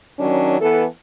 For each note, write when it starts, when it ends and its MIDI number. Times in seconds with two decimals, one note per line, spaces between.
0.19 0.58 51
0.19 0.58 54
0.19 0.58 61
0.19 0.58 62
0.61 0.85 52
0.61 0.85 59
0.61 0.85 69